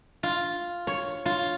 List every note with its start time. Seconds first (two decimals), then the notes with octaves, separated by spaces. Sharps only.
0.23 F4
0.87 C#5
1.26 F4